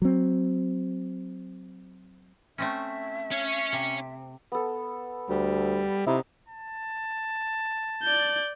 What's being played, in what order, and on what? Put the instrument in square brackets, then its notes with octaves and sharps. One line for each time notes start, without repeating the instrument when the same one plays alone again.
[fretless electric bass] F#3 C4
[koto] A3 C4 C#4 [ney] E5
[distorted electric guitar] C#4 C#5
[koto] C3
[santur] B3 A4
[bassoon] D2 [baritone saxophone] G3
[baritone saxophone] C3 [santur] D#4 [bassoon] E4
[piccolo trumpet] A5
[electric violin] D5 G6